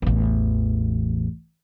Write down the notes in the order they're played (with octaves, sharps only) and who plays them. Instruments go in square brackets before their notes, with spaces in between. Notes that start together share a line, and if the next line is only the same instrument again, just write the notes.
[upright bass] A1 E2